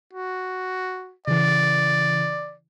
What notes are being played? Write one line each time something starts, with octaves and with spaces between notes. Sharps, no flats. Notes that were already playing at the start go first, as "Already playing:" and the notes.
F#4
C#3 E3 D5